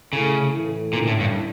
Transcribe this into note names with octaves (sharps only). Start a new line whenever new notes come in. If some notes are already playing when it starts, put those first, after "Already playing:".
C#3 A3 E4 A4
A2 E3 A3 E4 A4
A#2 D3 A3 C#4 E4
A2
G2